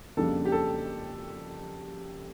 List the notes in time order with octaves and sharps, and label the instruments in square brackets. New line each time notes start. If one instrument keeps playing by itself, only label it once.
[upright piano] F2 C#3 G3 A#3 D4 A4
G4
A4